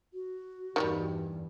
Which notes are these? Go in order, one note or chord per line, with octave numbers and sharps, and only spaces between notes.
F#4
E2 G2 D#3 F#3 G3